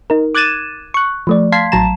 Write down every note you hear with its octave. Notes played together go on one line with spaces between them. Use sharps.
D#4 A#4
D6 F#6 G#6 A6 D#7 E7
C#6 F#6
F3 A3 D5
F5 A5 C6 G#6 B6 C7
A1 F#3 A5 A#5 E7